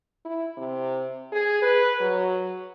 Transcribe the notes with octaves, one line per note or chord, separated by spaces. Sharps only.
E4
C3
G#4
B4
F#3